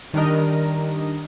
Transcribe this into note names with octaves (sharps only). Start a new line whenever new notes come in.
D#3 G3 D4 A#4 D#5